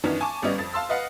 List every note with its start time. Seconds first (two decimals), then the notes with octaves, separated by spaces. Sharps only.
0.04 F#2 D#3 E3 B3 C#4 D4
0.21 G#5 A5 C#6 D6
0.42 G#1 G3 B3 C#4 D5 D#5
0.58 F2 A6
0.74 F5 A5 C6 E6
0.89 B4 D#5 F5 F#5